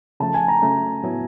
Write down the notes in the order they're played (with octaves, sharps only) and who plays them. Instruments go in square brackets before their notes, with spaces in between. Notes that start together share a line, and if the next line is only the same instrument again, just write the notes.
[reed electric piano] C#3 F3 A3 [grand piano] A5
[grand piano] G#5
A#5
[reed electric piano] C#3 F#3 A3 C#4
A2 F#3 B3 E4